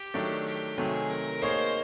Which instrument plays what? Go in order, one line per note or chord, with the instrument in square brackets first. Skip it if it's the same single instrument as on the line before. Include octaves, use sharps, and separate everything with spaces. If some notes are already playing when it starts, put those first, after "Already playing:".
Already playing: [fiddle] G4
[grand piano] D#3 F#3 A3 D4
[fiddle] G4
[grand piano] C3 D#3 F#3 A3 [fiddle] G#4
[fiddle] A#4
[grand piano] A#3 D#4 G#4 C#5 [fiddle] C5